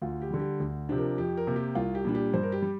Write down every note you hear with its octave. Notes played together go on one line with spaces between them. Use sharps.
D2 F4
G4
D3 G3
G4
D2
C3 F3 D4 G4
A#4
F2 G4
A#4
C3 A#3
G4
C2 F4
G4
A#2 G3 D4
G4
G2 C5
A#4
G4
G3